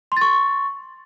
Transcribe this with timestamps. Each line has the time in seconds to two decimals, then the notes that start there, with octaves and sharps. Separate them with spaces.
0.12 C6
0.17 A6
0.21 C#6